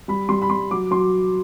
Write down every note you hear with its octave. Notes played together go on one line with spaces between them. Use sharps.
G3 B5
G3 C6
B5
G3 C6
F#3 D6
F#3 C6